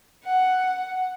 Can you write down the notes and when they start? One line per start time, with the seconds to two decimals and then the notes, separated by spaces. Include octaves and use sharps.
0.24 F#5